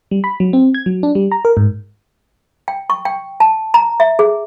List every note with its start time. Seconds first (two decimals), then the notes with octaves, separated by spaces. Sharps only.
0.11 G3
0.24 B5
0.40 F#3
0.53 C4
0.74 G#6
0.86 F#3
1.03 D4
1.15 G3
1.32 A#5
1.45 A#4
1.57 G#2
2.68 G5
2.90 C#6
3.05 G5
3.40 A5
3.74 A#5
4.00 E5
4.19 G#4